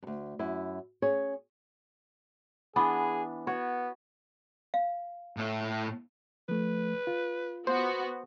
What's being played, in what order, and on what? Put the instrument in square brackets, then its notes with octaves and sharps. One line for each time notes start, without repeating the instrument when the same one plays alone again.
[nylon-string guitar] D2 G2
F#2 E4
C#4 G#4 C#5
[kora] E3 B3 D4 [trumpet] G#4
[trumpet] B3 [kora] F#4 C#5
[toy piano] F5
[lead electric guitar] A2 E5
[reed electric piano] F3 A3 [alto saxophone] B4
[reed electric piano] F4
[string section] B3 F#4 [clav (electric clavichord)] C5